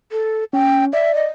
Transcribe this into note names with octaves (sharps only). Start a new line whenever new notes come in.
A4
C#4 G5
D5 E5
D#5